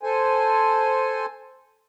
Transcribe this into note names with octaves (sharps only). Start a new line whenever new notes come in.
A4 C5 G#5